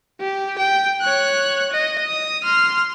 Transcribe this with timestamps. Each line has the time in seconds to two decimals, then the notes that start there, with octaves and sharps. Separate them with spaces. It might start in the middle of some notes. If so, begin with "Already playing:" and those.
0.20 G4
0.58 G5
1.01 C#5 F#6
1.72 D#5
2.04 D#6
2.43 C6 F6